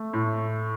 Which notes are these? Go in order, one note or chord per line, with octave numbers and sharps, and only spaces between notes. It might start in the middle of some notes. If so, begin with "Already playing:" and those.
Already playing: A3
A2